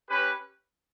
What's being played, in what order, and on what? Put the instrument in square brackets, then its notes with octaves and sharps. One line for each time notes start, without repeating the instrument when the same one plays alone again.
[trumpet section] C#4 G4 B4